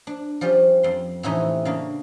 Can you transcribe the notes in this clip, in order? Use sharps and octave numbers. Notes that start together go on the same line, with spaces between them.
D4
F3 G3 C#4 G4
F2 C6
A2 C3 E3 C#4 D#4 G4
C#3 A#3 D4